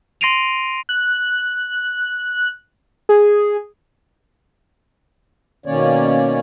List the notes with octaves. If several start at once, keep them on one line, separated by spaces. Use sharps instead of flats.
C6 A#6 C7 D7 D#7 F7
F#6
G#4
B2 D#3 A#3 C#4 C#5 D5